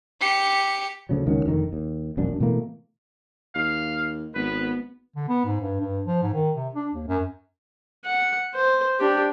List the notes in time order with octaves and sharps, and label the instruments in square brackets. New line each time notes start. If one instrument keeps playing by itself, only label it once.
[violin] G4 C#7
[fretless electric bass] D2 C#3 F3 F#3
C#2 D#3 F#3 C#4
F1 D3 D#3
D#2
E1 A#1 F#2 D4
B2 E3 A3 A#3
[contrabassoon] D#2 [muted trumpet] F5
[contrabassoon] G#1 [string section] B3 [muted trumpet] B4
[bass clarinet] D3
B3
G#2
G2
G2
F3
G#2
D#3
C3
D4
D#2
F#2
[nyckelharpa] F#5
C5
D4 G4